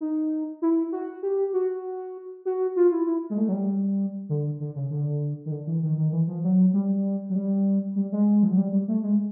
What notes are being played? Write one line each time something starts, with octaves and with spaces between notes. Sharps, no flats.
D#4
E4
F#4
G4
F#4
F#4
F4
E4
E4
G#3
A3
F#3
G3
D3
D3
C#3
D3
D#3
D3
E3
D#3
D#3
E3
F3
F#3
G3
F#3
G3
G3
G#3
F3
F#3
G3
G3
A3
G#3